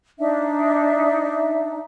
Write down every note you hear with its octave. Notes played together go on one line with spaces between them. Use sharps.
D4 D#4 E5